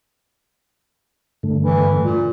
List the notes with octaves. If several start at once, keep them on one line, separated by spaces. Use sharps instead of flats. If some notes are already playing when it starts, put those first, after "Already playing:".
G2 D3 A3
E3
A#2